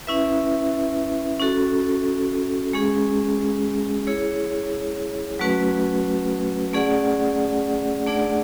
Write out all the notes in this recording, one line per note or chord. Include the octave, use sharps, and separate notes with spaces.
C#4 E4 B4 E5
C#4 F#4 A4
G#3 C#4 G#4
E4 G#4 C#5
F#3 A3 C#4 F#4 B4
A3 C#4 G#4 D5 F#5
A3 D4 G#4 D5 F#5